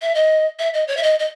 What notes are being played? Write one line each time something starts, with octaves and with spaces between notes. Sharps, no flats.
E5
D#5
E5
D#5
C#5
E5
D#5
D#5